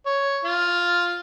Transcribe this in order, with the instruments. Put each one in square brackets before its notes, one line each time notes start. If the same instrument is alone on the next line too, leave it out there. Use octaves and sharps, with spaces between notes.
[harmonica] C#5
F4